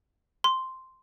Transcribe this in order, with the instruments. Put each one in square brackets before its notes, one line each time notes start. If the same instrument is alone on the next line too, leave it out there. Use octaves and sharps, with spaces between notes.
[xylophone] C6